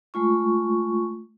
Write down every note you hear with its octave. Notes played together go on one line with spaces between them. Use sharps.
G#3 A3 F4 C#6